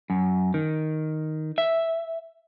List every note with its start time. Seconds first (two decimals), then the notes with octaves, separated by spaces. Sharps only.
0.10 F#2
0.54 D#3
1.58 E5